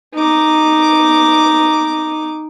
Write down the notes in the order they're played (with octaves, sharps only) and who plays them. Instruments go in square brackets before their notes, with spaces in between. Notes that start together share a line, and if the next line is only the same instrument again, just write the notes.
[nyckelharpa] D#4 D6